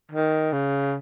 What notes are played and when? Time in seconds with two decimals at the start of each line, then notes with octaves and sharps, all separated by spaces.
0.12 D#3
0.53 C#3